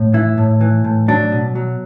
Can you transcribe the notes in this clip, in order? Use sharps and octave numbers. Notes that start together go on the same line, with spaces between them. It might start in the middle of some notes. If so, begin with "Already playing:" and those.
Already playing: A2
E3 E4
A2
E3
A2
F#3 D4
B2
F#3